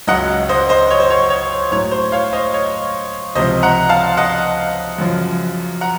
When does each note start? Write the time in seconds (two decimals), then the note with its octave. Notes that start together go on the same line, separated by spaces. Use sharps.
0.07 C#2 C#3 F#3 D#5 F#5
0.49 C5 D#5
0.69 C5 D#5
0.90 C#5
1.00 C5
1.10 C#5
1.30 C#5
1.72 A2 F#3 C#5
1.92 C5
2.12 C#5 F5
2.33 C5 D#5
2.54 C#5
3.35 C#2 C3 F3 C5 D#5
3.62 F#5 A#5
3.89 F5 A5
4.17 D#5 F#5
4.98 F#2 C#3 F3
5.81 F#5 A#5